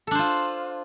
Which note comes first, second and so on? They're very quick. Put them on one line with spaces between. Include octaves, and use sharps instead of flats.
A4 D4 C5 F4